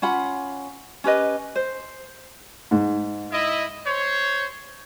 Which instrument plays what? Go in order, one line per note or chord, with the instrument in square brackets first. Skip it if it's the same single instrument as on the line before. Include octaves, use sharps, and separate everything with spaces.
[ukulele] C#4 F4 F#5 B5
C#4 G4 B4 D#5
C5
[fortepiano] G#2
[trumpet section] E4 D#5
C5 C#5